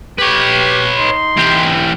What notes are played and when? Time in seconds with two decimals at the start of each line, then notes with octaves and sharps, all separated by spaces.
0.18 G4 B4 C#5
0.98 D#4 C6
1.37 E3 G4